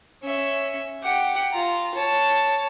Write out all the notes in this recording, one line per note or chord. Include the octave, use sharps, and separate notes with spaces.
C#4 E5
G4 F#5
F4 A#5
C#5 A5